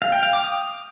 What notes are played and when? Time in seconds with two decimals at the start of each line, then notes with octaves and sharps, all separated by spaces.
0.02 F5
0.12 G5
0.23 F5
0.33 D6
0.44 D#6